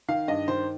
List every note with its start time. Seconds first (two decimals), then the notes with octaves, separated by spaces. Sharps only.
0.08 D#3 F5
0.28 G2 D#5
0.48 D#3 C5